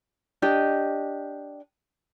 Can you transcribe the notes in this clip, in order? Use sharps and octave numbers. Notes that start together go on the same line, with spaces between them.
D4 G4 D#5